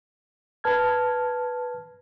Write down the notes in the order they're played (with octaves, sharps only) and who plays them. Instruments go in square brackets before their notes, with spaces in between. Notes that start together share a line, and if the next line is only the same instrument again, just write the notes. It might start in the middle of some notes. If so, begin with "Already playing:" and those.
[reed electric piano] B4 A5 F6 G#6